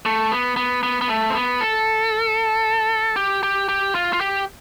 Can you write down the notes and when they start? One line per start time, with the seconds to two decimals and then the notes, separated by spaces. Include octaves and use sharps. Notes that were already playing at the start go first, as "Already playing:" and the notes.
0.06 A3
0.31 B3
0.56 B3
0.83 B3
1.01 B3
1.09 A3
1.30 C4
1.35 B3
1.61 A4
3.16 G4
3.43 G4
3.69 G4
3.95 F4
4.13 F4
4.21 G4